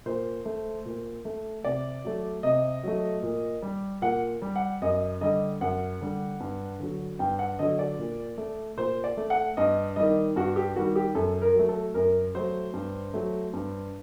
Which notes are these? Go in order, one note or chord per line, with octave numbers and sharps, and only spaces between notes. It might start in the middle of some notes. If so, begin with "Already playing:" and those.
A#2 C5
A3
A#2
A3
C3 D5
F#3 A3
C3 D#5
F#3 A3
A#2
G3
A#2 F#5
G3
F#5
F#2 D#5
D3 G3 D#5
F#2 F#5
D3 G3
G2
D3 F#3
G2 G5
F#5
D3 F#3 D#5
D5
A#2
A3
A#2 C5
D5
A3
F#5
G2 D#5
D#3 G3 D#5
G2 F#4
G4
D#3 G3 F#4
G4
F#2 A4
A#4
F#3 A3
A4
F#2 A#4
F#3 A3 C5
G2
F#3 A3
G2